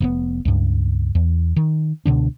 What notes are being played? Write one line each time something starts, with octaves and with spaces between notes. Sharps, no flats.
F1 B2 B3
C#2 G2
E2
D#3
C#2 B2 D3 D4